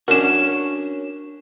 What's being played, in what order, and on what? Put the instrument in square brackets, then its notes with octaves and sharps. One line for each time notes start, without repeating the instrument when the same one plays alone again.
[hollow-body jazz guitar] C#4 D4 F#4 [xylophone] A#4 E7